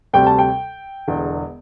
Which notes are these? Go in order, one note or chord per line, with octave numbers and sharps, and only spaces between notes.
D2 C3 G3 G5
A5
G5
E1 E2 D3